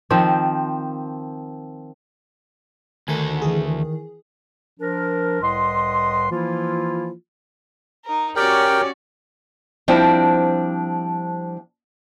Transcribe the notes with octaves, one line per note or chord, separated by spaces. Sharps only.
D#3 F3 C4
D2 D#3 A4 G#5
E3 G#4
F3 D4 A#4
C2 A2 B4 D#5 C6
E3 F3 A#3 E4 F4
D#4 A#4
C#4 F#4 G4 A#4 C#5 D5 G5
F3 G3 C4 D4 E4